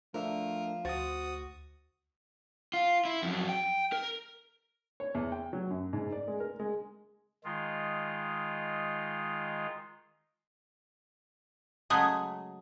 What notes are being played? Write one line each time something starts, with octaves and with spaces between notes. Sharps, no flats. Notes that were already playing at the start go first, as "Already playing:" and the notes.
F3 A3 D4 A#4 E5
D2 F#4 C5 D#6 A6
F4
E4
F2 F#3
G5
A#4
C#5
E2
G5
F#3
F#2
G#2
D5
G#3
A#4
G#3
D#3 G#3 F4
C#3 F#3 G#3 A3 G#4